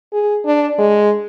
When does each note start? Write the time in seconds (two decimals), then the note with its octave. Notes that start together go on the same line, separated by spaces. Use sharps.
0.13 G#4
0.46 D4
0.78 G#3